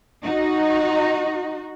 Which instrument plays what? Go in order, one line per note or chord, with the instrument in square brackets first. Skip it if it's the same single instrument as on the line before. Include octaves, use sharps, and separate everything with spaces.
[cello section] D#4 F#4